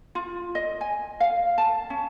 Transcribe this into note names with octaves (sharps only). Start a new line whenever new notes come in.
F4
D#5
G#5
F5
A5
C#4